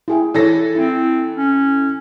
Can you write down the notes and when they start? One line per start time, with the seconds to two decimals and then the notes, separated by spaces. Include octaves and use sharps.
0.08 E4 G#4 G5
0.34 E3 A4 C#5 D5 A#6
0.75 C4 E4
1.36 C#4